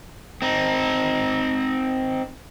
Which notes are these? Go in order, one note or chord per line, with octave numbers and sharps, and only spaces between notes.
C4 D#4